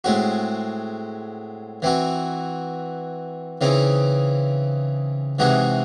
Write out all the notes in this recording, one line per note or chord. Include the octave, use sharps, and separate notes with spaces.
A2 G#3 C4 F#4
E3 C4 F#4
C#3 E3 C4 D#4
C3 E3 G#3 D#4 F#4